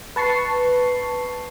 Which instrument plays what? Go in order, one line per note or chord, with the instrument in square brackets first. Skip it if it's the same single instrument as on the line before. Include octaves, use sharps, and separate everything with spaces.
[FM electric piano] B4 A5 C#6 C7